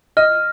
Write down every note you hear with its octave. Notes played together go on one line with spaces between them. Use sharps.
D#5 F6